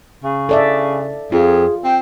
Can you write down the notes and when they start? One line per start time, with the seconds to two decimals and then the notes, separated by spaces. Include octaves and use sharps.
0.24 C#3
0.49 A4 D5 E5
1.32 F2 F4 G#4
1.84 C4 G5